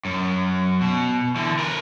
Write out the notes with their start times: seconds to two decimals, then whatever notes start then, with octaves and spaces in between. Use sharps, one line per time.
0.05 F#2
0.81 B2
1.36 D3 E3
1.59 A#4 B4